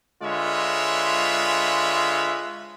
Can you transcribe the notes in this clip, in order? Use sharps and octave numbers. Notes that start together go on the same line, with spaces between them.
D3 G#3 F4 B4 C#5 E5